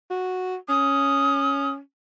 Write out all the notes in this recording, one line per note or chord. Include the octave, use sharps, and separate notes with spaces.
F#4
C#4 D#6